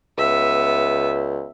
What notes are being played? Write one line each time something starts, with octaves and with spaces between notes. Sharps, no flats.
C#2 B3 E5